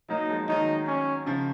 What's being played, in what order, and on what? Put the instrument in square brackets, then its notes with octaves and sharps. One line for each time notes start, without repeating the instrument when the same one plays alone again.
[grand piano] F#3 A#3 [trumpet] D#4
[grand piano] F3 G#3
[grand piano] D#3 F#3 [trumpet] D#4
[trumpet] C#4
[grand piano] C#3 F3